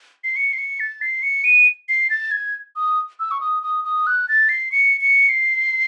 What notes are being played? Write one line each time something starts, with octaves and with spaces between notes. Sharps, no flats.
C7
C#7
C7
C#7
A6
C7
C#7
D#7
C7
A6
G#6
D#6
E6
C#6
D#6
D#6
D#6
F#6
A6
C7
C#7
C#7
C7